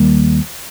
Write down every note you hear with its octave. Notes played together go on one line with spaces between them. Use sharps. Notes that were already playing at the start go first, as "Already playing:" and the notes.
Already playing: D#2 D#3 G3 A#3